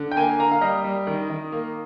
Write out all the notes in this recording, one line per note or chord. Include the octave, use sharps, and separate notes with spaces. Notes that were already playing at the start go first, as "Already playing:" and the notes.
Already playing: D3
G5
A#3 G#5
A#3 A#5
F5
G3 D#5
G3
D#3
D#3
A#3